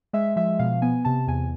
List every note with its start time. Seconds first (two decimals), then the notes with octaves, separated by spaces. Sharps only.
0.13 G#3 E5
0.36 F3 E5
0.59 B2 F5
0.82 B3 G#5
1.05 C3 A5
1.27 E2 G#5